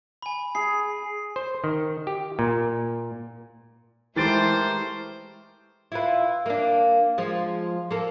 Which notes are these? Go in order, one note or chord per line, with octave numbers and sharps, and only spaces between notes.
G#5 B5
G#4 C7
C5
D#3
G4
A#2
E3 G#3 A3 G4 A#4 C5 A6 D7
E4 F4 B4
A#3 D4
F3 G#3
A#3 A4